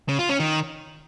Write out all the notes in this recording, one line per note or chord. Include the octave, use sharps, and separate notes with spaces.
C#3
F4
C#4
D#3